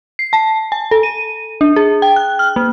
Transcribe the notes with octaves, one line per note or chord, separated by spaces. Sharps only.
C7
A5
G#5
A4
D#7
D4
G#4
G5
F#6
F6
A#3